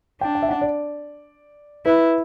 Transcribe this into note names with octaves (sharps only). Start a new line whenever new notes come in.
D4 G5
G5
E5
F#5
D5
E4 B4